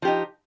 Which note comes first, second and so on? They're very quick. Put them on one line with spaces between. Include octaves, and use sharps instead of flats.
F3 G4 D#4